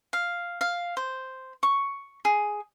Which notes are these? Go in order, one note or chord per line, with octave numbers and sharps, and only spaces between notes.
F5
F5
C5
C#6
G#4